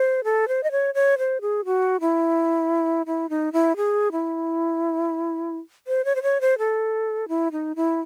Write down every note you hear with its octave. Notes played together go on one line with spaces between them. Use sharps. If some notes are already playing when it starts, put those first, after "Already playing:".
Already playing: C5
A4
C5
D#5
C#5
C#5
C5
G#4
F#4
E4
E4
D#4
E4
G#4
E4
C5
C#5
C5
C#5
C5
A4
E4
D#4
E4